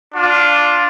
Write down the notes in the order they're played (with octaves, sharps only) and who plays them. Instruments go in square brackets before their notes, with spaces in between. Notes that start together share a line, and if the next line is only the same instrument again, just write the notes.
[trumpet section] D4 F4